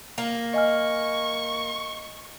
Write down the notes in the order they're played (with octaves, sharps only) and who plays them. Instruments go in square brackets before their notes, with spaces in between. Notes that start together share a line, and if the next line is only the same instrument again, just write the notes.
[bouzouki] A#3
[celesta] D#5 G#5 F6 [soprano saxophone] C#6